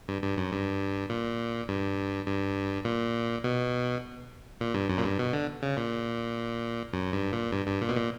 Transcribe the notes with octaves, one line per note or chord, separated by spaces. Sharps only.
G2
G2
F#2
G2
A#2
G2
G2
A#2
B2
A#2
G2
F#2
A#2
G2
B2
D3
C#3
A#2
F#2
G2
A#2
G2
G2
A#2
B2
A#2